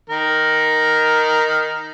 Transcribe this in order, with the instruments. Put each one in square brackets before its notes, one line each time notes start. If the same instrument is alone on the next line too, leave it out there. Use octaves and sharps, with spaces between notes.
[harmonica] D#3 A#4